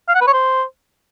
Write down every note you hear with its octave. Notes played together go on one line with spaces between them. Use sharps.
F5
F#5
B4
C#5
C5